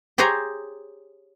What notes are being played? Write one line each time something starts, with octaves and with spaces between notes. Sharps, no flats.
G4 G#4 C5 C#5 G#5 A#5